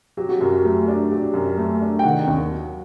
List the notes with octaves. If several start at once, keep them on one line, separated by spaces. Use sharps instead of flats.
F#3 G4
F#4
F#2 G4
A3
D4
F#3 G4
F#2
A3
D4
G5
D#3 F#5
D#2
F#3